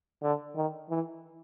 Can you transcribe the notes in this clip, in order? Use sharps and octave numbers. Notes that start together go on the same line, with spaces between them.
D3
D#3
E3